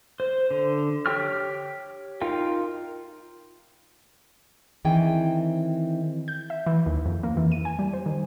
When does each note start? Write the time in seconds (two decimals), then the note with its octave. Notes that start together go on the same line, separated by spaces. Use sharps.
0.20 C5
0.51 D3
1.06 G4 C#5 G5 C#6 F6
2.22 D#4 F4 A#4 F5 G5
4.85 D#3 E3 C4 G#4 G5
6.28 G6
6.50 E5
6.66 E3
6.86 D#2
7.06 F2
7.23 A#3
7.37 E3
7.52 D#7
7.65 G#5
7.79 G3
7.93 C5
8.06 D#3